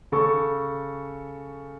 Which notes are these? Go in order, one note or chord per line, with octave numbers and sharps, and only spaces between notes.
C#3 A4 C#6